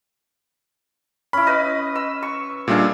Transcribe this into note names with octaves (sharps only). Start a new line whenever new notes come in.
C#4 E4 B5
B4 D#5
E6
C#6
A#2 G3 D4 G#4 E5 F5